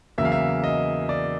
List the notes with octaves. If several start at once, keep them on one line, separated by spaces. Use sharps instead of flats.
E2 C#3 F#3 A#3 E5
F5
E5
D#5
D5